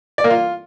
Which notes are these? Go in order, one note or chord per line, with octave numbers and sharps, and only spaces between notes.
D5
A#3
F4